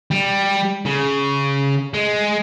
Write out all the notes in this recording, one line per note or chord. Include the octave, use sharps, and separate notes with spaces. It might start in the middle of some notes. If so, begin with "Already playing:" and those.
G3
C#3
G#3